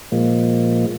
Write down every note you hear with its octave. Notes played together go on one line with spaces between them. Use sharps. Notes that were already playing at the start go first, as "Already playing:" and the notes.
A#2 F3 G#3 A#3